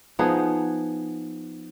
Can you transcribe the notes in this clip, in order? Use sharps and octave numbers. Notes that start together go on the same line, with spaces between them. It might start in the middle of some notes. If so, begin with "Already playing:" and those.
F3 B3 D#4 G#4